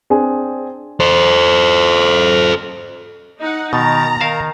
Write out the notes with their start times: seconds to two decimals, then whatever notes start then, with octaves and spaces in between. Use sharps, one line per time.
0.10 C4 D4 G#4 G#5
1.00 A4 C5
3.39 D#4 F#5
3.73 B2 D#3 A#5 A6
4.21 D#3 A#4 F5 A5